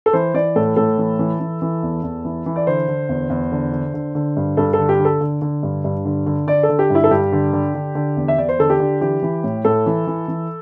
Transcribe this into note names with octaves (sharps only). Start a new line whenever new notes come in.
A4
E3 C5
E3 D5
A2 A4
A2 A4
E3
E3
E3
E3
E2
E2
E3
E3
D5
D3 C5
D3
E2
E2
D3
D3
D3
D3
G2
G2 A4
A4
D3
G4
D3
A4
D3
D3
G2
G2
D3
D3
D3 D5
A4
D3
G4
G2 E4
A4
G2 G4
D3
D3
D3
D3
E2
E5
E2 D5
C5
D3 A4
G4
D3
E3 G4
E3
A2
A2 A4
E3
E3
E3